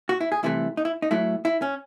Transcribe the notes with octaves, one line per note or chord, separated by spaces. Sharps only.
F#4
E4
G#4
C2 C3 E3 A3 E4
D#4
E4
D#4
A2 F#3 A3 E4
E4
C#4